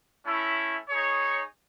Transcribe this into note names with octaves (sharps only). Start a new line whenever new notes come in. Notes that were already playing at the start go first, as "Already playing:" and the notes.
A3 C#4 E4
D#4 G#4 C#5